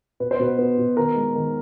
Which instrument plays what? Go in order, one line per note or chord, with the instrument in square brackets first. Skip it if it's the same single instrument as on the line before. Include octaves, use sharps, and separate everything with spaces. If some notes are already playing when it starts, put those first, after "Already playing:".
[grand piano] B2 B4
C5
B2 B4
B3
B2
D#3 A#4
G#3
D#3